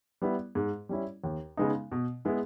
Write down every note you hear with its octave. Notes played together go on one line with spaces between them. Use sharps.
G3 B3 E4
G#2
G3 C#4 E4
D#2
C#3 G#3 B3 D#4
B2
G#3 B3 E4